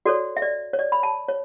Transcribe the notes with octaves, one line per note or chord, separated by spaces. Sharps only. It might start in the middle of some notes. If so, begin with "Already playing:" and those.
F#4 A4 C#5 D5
E5
D5
C#5
D5
B5
A5
C#5